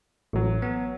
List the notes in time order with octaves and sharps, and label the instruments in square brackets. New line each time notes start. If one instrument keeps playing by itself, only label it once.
[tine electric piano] A1 [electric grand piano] F#3 A3
[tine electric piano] B3